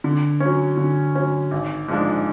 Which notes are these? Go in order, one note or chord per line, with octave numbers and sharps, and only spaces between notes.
D3
C#4
F#3
D3
F#3 C#4
G#1
G#2 F3 G#3 D4